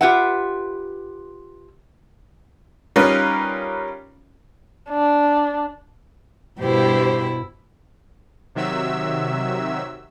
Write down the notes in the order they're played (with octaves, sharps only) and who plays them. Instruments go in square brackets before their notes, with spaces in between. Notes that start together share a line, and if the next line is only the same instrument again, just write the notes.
[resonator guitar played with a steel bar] F4 G4 B4 E5 F#5
[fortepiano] G3 C#4 D#4 F4 A#4 B4
[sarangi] D4
[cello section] G2 G4 C5 [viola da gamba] B2 E4
[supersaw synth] C3 D#3 F#3 E5 E6